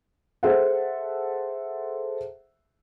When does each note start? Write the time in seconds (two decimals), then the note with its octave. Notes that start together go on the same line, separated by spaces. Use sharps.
0.43 G#4 A4 C5 E5 F#5